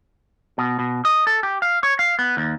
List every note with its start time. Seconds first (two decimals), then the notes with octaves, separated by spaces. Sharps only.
0.58 B2
0.79 B2
1.05 D#5
1.27 A4
1.43 G4
1.62 F5
1.83 C#5
1.99 F5
2.19 B3
2.37 D#2